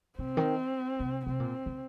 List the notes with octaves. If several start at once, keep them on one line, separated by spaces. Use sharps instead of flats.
C3 C4
D#3
C3
C3 C4
A#2
C#3